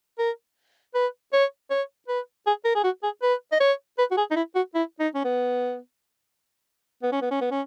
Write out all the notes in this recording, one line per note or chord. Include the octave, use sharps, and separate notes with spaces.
A#4
B4
C#5
C#5
B4
G#4
A#4
G#4
F#4
G#4
B4
D#5
C#5
B4
F#4
G#4
D#4
E4
F#4
E4
D#4
C#4
B3
B3
C#4
B3
C#4
B3
C#4